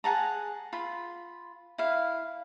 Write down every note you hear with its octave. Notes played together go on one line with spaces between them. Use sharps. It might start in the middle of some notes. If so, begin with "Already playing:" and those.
G#4 F#5 A5 A#5
F4 B5
E4 F5